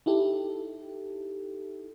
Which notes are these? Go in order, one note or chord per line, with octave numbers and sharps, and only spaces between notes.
D#4 E4 G4 A4